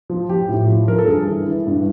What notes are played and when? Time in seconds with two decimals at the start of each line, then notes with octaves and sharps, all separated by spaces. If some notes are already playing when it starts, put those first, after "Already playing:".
0.10 F3
0.29 F3 G4
0.49 A2
0.68 F3
0.88 F3 A#4
0.98 A4
1.07 G2 G#4
1.27 E3
1.46 E3
1.67 G2